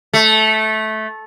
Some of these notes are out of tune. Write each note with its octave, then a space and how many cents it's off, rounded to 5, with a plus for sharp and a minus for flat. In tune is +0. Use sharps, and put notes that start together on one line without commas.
A3 -15